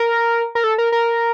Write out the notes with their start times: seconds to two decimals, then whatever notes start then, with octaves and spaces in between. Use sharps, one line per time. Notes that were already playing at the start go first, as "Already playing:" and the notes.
Already playing: A#4
0.55 A#4
0.64 A4
0.78 A#4
0.92 A#4